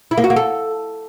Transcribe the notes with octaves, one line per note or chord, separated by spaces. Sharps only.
E4
A#3
F#4
A#3
A4